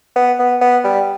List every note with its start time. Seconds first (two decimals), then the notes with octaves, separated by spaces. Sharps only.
0.16 B3
0.39 B3
0.61 B3
0.84 G3